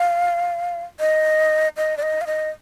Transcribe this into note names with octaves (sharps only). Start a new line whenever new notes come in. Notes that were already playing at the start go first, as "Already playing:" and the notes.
Already playing: F5
D#5
D#5
D5
D#5
F5
D#5